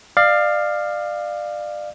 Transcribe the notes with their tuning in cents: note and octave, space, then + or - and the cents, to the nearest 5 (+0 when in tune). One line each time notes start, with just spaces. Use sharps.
D5 +30 F5 +0